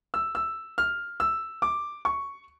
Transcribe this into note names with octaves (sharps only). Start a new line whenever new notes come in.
E6
E6
F6
E6
D6
C#6